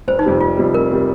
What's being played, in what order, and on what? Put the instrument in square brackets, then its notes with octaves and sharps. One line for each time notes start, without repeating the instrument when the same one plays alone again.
[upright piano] F1 [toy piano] C5
[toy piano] D#4
[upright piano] F2 C3 G3
[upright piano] F1 [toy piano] F4
[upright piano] F2 C3 G3
[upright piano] F1 [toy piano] A#4
[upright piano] C3 G3